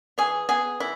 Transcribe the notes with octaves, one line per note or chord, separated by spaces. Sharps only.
E3 G#4
B3 G#4
E3 E4